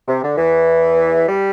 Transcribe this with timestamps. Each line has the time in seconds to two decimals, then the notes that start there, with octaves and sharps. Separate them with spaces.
0.08 C3
0.23 D3
0.38 E2 E3
1.29 G3